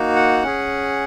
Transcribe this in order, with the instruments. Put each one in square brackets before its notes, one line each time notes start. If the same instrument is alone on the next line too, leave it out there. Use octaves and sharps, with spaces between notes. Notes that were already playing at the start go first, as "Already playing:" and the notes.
Already playing: [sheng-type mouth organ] A#3 D#4 F#4
F#5
C#4 G#4